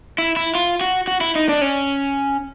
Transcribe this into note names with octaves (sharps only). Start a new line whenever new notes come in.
E4
E4
F4
F#4
F#4
E4
D#4
D4
C#4